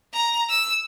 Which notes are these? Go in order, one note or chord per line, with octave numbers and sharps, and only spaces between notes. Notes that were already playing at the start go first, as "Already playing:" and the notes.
A#5
E6